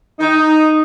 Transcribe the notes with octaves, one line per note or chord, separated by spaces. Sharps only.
D#4